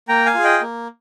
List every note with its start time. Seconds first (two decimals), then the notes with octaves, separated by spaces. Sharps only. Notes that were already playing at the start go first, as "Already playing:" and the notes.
0.09 A#3 G5 A#5
0.26 F5 G#5
0.35 F4 G#4
0.44 D#5 G5
0.61 A#3